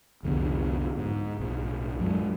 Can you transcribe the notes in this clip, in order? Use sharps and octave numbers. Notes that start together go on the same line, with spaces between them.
C2 F2 D3 B3
G#2
B1 A2
F#2 F#3 G#3